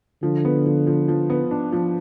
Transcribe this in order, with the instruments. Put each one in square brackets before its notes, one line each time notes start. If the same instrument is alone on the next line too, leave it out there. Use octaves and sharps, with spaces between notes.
[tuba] D3 [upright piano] F3
[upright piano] B3
F3
F3
F3
B3
D4
F3